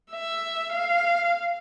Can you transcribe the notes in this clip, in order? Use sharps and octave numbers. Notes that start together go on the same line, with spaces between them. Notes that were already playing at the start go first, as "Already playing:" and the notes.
E5
F5